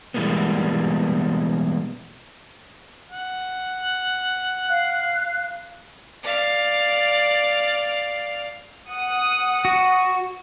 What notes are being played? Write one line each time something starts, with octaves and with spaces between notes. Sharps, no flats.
B2 E3 G3 G#3 A#3 B3
F#5
F5 F#6
D5 F5
F#5 D#6
F#4